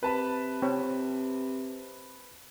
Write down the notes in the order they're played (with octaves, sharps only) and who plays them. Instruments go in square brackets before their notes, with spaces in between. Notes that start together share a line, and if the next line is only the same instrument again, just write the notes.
[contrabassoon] C3 [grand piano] B4 A5 B5
[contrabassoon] C3 [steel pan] C4 C#5